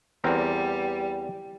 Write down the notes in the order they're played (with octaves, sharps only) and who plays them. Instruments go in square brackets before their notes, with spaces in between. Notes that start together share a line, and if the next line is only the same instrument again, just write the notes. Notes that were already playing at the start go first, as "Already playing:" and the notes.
[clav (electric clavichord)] E2 C4 A#4 [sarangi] G3